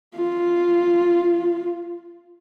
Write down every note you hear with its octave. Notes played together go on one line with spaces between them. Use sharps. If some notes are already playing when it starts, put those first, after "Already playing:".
F4